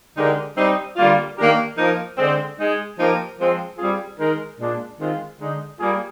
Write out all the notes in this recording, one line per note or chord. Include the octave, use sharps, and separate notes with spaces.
D3 G#3 D#4 G4 A#4
G3 C4 D#4
D3 G3 A#3 F4
D#3 A#3 D4 G4 A#4
F3 A#3 D#4 A#4
D3 G#3 C4
G#3 D#4 G#4
F3 A#3 D#4 G4 A#4
F3 G#3 C4
G3 C4 F4 G#4
D#3 G#3 D#4 A#4
A#2 G#3 D4
D#3 G#3 C4 F4
D3 G#3 D#4
G3 A#3 F4 G#4